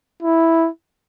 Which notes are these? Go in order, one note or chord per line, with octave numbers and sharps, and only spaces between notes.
E4